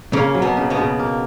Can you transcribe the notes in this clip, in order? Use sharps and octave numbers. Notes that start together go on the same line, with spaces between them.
C#3 A#3 C#4
F#3
B2 B3
C#3
B2 B3
C#3
A#3